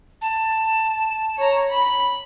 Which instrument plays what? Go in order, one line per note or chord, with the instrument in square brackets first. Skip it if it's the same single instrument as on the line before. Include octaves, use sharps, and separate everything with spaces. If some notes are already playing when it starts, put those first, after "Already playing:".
[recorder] A5
[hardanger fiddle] C#5 A#5
B5